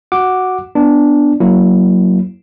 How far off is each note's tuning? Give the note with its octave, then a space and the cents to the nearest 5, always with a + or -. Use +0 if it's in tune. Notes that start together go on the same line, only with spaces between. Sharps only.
F#4 +0 F#5 +0 D6 +0
B3 +0 D4 +0
F#3 +0 A#3 +0 E4 +0